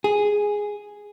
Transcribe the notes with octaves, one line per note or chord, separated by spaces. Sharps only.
G#4